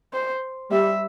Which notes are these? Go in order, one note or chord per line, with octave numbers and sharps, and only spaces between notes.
C5
G3 E5